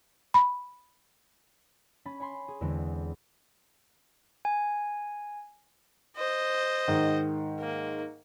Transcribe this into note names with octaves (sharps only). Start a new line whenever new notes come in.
B5
C#4 B5 A6
C#5 G#5 B5 C6
G#4
E2 D3 G#3 B3 C4
G#5
C5 D#5
G#2 D#3
A#3